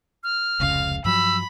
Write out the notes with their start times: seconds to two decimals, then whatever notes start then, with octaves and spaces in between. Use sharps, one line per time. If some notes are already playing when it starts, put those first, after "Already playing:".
0.24 F6
0.60 F1 C#2 C#3 F5
1.05 G2 F3 F#3 B5 E6